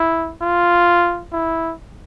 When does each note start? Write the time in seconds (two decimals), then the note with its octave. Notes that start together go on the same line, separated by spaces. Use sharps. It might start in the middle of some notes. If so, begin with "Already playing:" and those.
Already playing: E4
0.42 F4
1.32 E4